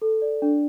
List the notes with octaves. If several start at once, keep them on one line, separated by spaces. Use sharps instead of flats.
A4
D5
D4